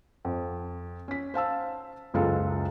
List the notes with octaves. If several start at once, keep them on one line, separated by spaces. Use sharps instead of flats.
F2
C#4 B6
C5 F5 A5 E6
F#1 C#2 G#3 F4 A4 F5